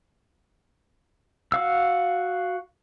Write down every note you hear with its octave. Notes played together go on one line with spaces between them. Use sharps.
F#4 F5 E6